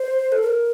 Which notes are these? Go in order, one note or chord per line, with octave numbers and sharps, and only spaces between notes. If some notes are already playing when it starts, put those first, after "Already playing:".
Already playing: C5
A4
A#4